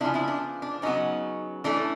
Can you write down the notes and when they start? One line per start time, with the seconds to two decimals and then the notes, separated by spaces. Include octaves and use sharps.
0.01 C#3 F3 G#3 B3 D4 E4
0.14 D4 E4
0.28 D4
0.62 D4
0.82 C#3 F#3 B3 C#4 D#4
1.64 E3 A3 C#4 D4